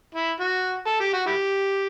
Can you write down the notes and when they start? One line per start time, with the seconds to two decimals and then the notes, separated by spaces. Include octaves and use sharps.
0.15 E4
0.40 F#4
0.87 A4
1.00 G4
1.13 F#4
1.26 E4 G4